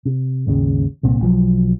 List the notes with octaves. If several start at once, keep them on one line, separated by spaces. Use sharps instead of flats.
C3
G#1 D#2 C#3
C2 A#2 C4
B1 F3 F#3